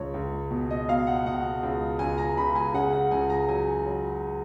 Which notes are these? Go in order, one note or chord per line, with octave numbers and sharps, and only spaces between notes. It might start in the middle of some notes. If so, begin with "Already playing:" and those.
Already playing: C#2 C#5
C#2
B2
D#5
B2 F5
F#5
B2 F#5
C#2
C#2 G#5
A#5
C#2 B5
G#5
C#3 F#5
F#5
C#2 G#5
A#5
F#3 G#5
F#3